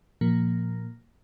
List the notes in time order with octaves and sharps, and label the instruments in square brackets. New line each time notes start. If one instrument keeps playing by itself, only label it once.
[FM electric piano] A#2 F3 A#3